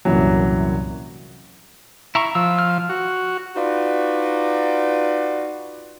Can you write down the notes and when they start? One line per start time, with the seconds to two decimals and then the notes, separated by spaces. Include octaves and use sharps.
0.05 C2 F#2 A#2 E3 F#3
2.15 E4 A#5 C#6
2.35 F3 E6
2.59 F6
2.89 F#4
3.56 D#4 F4 F#4 B4 D5